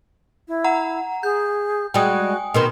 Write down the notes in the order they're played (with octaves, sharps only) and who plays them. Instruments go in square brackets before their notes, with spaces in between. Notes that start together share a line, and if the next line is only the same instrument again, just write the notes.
[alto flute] E4
[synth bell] F#5 A#5
[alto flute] G#4 [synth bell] G6
[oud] G3 G#3 [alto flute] F#4 [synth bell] G5 G#5 D#6
[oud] B2 D#3 C4 [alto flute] A#4